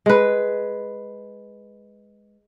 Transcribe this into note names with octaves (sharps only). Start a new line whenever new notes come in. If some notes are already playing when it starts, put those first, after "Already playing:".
G#3 B4